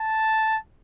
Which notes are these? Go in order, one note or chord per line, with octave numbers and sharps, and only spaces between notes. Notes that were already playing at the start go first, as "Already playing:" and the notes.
Already playing: A5